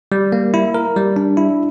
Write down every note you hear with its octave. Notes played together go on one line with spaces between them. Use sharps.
G3
A#3
E4
A#4
G3
D4
E4